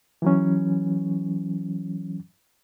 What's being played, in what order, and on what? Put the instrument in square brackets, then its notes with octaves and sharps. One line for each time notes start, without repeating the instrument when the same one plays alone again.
[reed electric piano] E3 F#3 C#4